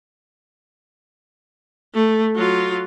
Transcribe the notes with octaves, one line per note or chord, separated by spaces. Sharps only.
A3
F#3 F4